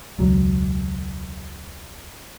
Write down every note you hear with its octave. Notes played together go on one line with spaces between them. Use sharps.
E1 C#2 F#3